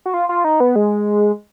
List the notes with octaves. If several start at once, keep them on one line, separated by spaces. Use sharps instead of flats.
F#4
F4
F4
D#4
B3
G#3